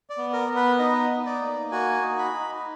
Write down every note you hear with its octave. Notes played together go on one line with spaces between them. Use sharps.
D5
B3
A#4
B3
B4
D#4 D#5
D#4
D5
A#3
F#4 G#5
D#4
B5
D#4